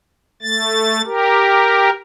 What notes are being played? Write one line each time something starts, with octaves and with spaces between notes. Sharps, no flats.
A3 A6
G4 A#4